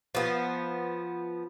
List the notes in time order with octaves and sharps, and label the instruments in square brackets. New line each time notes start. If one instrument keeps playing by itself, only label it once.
[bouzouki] F3 B3